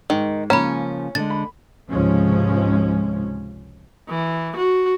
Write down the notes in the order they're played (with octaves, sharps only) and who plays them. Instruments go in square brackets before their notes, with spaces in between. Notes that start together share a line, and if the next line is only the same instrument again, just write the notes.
[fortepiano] G#2 [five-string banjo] D#3
[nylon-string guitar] C#3 F3 A#3 [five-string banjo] C#4 [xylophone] A#5 B5
[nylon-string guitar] D3 G#3 [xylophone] A6
[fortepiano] B5
[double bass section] C#2 G#2 C3 F3 G#3 C#4
[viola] E3
F#4